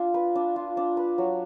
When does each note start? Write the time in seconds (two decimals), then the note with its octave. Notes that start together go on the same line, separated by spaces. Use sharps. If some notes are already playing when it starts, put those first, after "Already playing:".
Already playing: D4 F4
0.14 B4
0.35 D4
0.56 F4
0.77 D4
0.97 B4
1.18 F#3